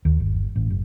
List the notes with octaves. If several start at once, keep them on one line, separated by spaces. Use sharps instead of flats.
D#2
G1
A1
F#1